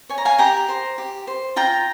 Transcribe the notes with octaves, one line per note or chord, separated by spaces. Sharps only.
C#5 G#5
A#5
F5 G#5
G4 G5 A#5
C5
G4
C5
F4 G5 A#5